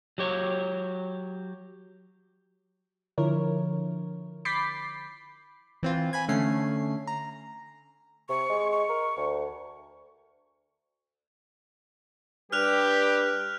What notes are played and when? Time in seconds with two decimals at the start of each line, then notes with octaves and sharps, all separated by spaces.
0.18 F#3 G4 C#5
3.18 D3 F3 E4 A#4 C#5
4.45 B5 D6 G6 A6 B6 C7
5.83 E3 C4 F4
6.13 G#5 B5 G#6
6.28 D3 A3 C#4 C7
7.07 A#5
8.29 C3 C#6
8.49 G#3
8.72 C#6
8.89 A#4
9.17 D2
12.52 G3 D4 G4 B4 F6 F#6 F7